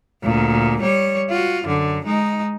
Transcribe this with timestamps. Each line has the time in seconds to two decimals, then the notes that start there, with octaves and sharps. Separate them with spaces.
0.23 D2 A#2
0.82 G3 C#5
1.30 F4 F#4
1.65 F#2 D3
2.05 G#3 D#4